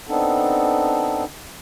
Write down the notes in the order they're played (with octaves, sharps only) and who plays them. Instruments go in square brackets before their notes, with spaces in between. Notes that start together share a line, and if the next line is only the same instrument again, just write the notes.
[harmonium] B3 C4 D4 D#4 A4